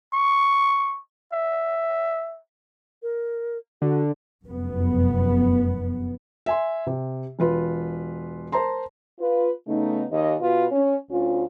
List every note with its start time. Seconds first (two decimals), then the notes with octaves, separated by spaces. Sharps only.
0.13 C#6
1.32 E5
3.03 A#4
3.82 D3 F#4
4.45 F1 F#2 B3
6.46 E5 G#5 C6
6.87 C3
7.39 E1 F4 B4
8.52 A#4 C5 A5 A#5 C6
9.20 F4 B4
9.67 C#3 A3 B3 D#4
10.11 D#2 D#5
10.40 B2 F4 F#4 B4
10.71 C#4
11.10 D2 C#4 F4